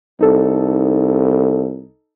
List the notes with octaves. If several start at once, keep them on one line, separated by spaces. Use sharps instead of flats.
C2 D#4 A4